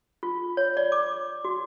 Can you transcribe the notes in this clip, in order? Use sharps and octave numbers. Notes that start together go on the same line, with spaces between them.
F4
C#5
D5
D6
F#4